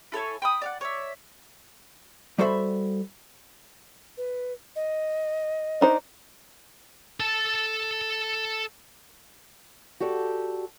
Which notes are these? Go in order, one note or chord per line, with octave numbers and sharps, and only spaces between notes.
E4 A4 C#5 G#5
G5 B5 D#6
D5 F5 F#5
C#5 D5 E5
G3 F#4 A4 C5 E5 B5
B4
D#5
D4 D#4 C5
A4 A5
F#4 G4 A4 D5